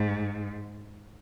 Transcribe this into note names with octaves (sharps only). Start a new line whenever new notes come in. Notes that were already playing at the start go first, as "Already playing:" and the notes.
Already playing: G#2